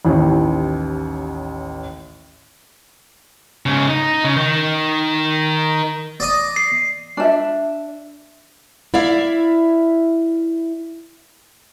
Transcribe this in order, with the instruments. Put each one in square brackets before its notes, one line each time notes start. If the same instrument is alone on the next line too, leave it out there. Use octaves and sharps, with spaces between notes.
[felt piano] A1 D#2 A2
[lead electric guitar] G#2 C#3
D#4
C#3
D#3 D#4
[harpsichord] D5 D#5
[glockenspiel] C7
[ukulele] D4 E5
[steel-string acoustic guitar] E4 D5 E5 F5